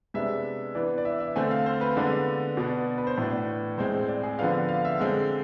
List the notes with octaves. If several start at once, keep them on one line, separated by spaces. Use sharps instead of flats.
C3 G#3 B3 D4 E5
E3 B3 D4 D5
D5
E5
E5
D3 A3 C4 G#5
F5
C5
B4
D3 G#3 B3 D4 D5
B2 B3 D4
B4
C5
A2 E3 B3 D4 D5
A2 G#3 C4 C5
C5
D5
G#4
D3 F3 B3 D4 F5
F5
E5
D3 G#3 C4